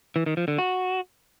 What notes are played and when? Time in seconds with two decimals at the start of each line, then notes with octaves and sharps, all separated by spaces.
0.16 E3
0.26 D#3
0.37 F3
0.48 D3
0.58 F#4